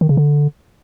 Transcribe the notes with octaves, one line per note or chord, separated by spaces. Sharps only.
D#3
C#3
D3